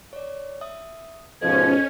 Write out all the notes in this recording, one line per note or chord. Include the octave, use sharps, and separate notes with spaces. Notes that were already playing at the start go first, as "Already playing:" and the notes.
C#5 D5
E5 D#6
G#2 B2 F3 C#4 A4 C5 D#5 G#6